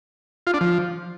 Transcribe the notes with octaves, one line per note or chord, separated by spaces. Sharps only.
F4
D4
F3